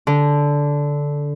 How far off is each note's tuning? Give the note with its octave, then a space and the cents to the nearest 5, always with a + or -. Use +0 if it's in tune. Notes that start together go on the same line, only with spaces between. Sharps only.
D3 -10